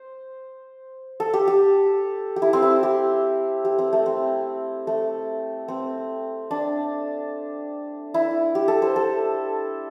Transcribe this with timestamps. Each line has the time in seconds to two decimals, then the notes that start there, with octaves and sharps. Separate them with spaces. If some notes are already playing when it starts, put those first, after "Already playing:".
Already playing: C5
1.20 A4
1.34 G4
1.48 G4
2.36 G4
2.42 E4
2.53 C4
2.62 E4
2.83 G4
3.65 G4
3.78 C4
3.93 A3
4.06 C4
4.87 A3
5.68 C4
6.51 D4
8.14 E4
8.55 G4
8.68 A4
8.82 C5
8.96 A4